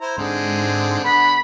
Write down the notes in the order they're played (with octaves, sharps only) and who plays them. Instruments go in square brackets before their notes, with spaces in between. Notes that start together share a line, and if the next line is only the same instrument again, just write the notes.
[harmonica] E4 C5 A#5
[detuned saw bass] G#2 [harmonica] D3 G#3 C4
[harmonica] D3 B3 [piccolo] B5